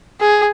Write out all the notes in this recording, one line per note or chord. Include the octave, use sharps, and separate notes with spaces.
G#4